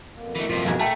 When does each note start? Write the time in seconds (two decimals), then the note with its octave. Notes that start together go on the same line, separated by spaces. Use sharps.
0.14 F2 B2 A#3
0.35 E3 A3
0.50 G2 C3 F4 C5
0.65 E1 B1 F3 G#5
0.79 A3 A#3 F#4 A4 E5 G5 A5 A#5